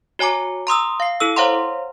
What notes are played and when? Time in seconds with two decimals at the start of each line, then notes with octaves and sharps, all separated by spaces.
0.19 F#4 C#5 G#5 A#5 D6
0.67 A#5 C6 D#6 E6
1.00 F5 C7
1.20 E4 A4 E6
1.36 C5 C#5 F5 F#5 A#5 C6